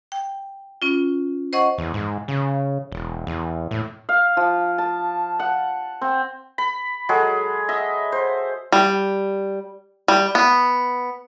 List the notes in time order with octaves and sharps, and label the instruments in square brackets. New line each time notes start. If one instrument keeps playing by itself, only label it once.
[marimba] G5
C#4 F4
C5 D#5 F#5 C#6
[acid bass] E2
G#2
C#3
E1
E2
A2
[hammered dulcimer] F5
F3
A5
F#5
C4
[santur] B5
F#3 G#3 G#4 A4
D#5 E5
C5
[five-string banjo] G3
G3
B3